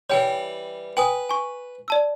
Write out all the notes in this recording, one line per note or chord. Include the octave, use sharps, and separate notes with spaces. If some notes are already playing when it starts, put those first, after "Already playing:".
E3 G3 C#5 G5
B4 G5 G#5 D#6
G#5 C#6
D5 A5 E6